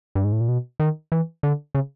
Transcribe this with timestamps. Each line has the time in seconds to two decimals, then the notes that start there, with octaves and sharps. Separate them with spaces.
0.15 G2
0.24 G#2
0.32 A2
0.40 A#2
0.48 B2
0.80 D#3
1.12 E3
1.43 D3
1.75 C#3